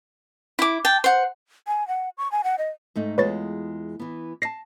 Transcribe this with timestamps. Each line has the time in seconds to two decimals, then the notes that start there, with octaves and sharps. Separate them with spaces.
0.59 E4 D6
0.85 G5 A5
1.04 C5 F#5
1.67 G#5
1.88 F#5
2.18 C#6
2.32 G#5
2.44 F#5
2.58 D#5
2.96 G#2 A3 D#4
3.18 E2 G#3 F4 B4 C#5 A6
4.00 E3 B3
4.42 D5 A5 A#6 C7